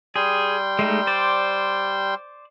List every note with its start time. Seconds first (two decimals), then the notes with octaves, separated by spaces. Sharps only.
0.16 G3 G#4 G5 C6
0.79 G#3 A3 D#4
1.07 C5 D5